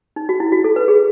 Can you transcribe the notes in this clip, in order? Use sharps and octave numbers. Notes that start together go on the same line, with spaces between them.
D#4
F#4
E4
F#4
A4
B4
G#4